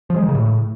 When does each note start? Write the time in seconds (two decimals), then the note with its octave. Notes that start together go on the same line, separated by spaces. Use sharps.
0.10 F3
0.16 G#3
0.22 D#3
0.28 C#3
0.35 A2